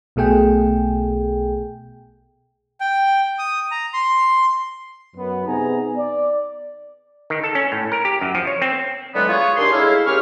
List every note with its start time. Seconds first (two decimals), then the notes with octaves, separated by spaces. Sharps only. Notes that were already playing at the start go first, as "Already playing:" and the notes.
0.16 B1 B2 A3 G#4 G5
2.81 G5
3.39 D#6
3.71 A#5
3.94 C6
5.16 F#2 B3
5.46 C3 B3 D#4 G#4 G#5 A#5
5.97 D5
7.30 D#3
7.44 A4
7.55 C#4
7.72 A2
7.92 A#4
8.05 G4
8.21 F#2
8.35 F3
8.47 C#5
8.62 C4
9.14 D3 E3 F#3 G#3 B3
9.28 F4 G#4 C#5
9.57 A#2 D#3 D4 G4 G#4 C6
9.72 A2 G#3 E4 C#5 E5 F5
10.06 D#2 G#3 C#4 G4 C#6 F6